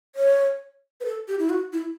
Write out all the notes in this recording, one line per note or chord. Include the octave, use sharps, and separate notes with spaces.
C#5
B4
A4
G4
E4
F#4
E4